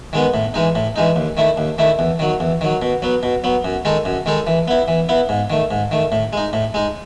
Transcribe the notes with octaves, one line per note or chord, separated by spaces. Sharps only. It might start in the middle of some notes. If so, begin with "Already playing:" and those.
D#3 G#3 B3
A2
E3 G#3 D#4
A2
E3 G#3 D#4
D#2
D#3 A3 E4
D#2
D#3 A3 E4
E2
D#3 F#3
E2
D#3 F#3
B2
F#3 B3
B2
F#3 B3
F#2
D#3 G#3 D#4 A4
F#2
D#3 G#3 D#4 A4
E3
B3 E4
E3
B3 E4
G#2
D#3 A3
G#2
D#3 A3
A2
G#3 D#4
A2
G#3 D#4